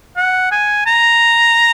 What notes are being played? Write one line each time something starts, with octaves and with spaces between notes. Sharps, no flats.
F#5
G#5
A#5